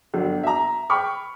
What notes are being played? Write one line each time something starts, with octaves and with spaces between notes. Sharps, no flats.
G1 F#3
E5 A#5
G5 B5 C#6 F6